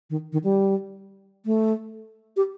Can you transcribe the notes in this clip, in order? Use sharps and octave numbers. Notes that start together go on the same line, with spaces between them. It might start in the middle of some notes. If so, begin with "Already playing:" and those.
D#3
D#3
G3
A3
G4